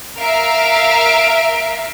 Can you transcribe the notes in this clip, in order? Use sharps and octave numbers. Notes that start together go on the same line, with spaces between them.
A#4 E5 F5 D7